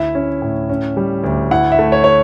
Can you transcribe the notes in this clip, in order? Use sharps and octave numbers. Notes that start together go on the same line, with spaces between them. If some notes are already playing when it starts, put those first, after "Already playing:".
Already playing: D2 E4 E5
C#4
A2
C#4
G3
D2
E4 F#5
E5
A3
C#5
C#5